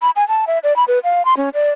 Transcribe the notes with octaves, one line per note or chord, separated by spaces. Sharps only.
B5
G#5
A5
E5
D5
B5
B4
F5
C6
C#4
D5